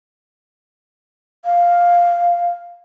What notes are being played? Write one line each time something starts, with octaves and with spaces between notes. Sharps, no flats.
F5